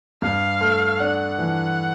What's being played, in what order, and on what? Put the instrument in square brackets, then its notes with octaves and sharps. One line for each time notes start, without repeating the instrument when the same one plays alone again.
[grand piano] G2 [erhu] F5
[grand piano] A3
[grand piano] D4 [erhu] F#5
[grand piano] E3